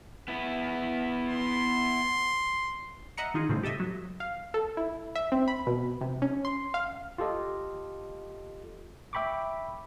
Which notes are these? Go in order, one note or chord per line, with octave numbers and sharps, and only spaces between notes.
B3 E4
C6
D#5 E5 F#5 A#5 C#7
D#3 D#4 F4 G#4
A2 C#3 F3 G3 C4 D#4
G4 A4 D#5 E5
F#3
F5
A4
E4
E5
C4
B5
B2
C3
C#4
C6
F5
F4 G4 A4 D#5
E5 G5 B5 C#6 D6